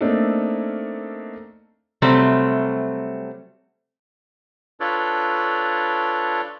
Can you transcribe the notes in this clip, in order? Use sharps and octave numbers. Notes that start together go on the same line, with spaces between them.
A3 A#3 C4 D4 D#4 A4
C3 F#3 G3 A3 C4
D4 F4 A4 B4 C#5 D5